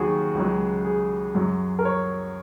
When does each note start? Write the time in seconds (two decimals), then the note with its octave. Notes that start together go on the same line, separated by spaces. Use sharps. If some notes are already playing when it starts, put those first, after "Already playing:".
Already playing: D#2 D#3 F#3 F#4 G#4
0.35 C#2 C#3 F#3
0.85 G#4
1.35 F#2 F#3
1.79 A#4
1.85 C#5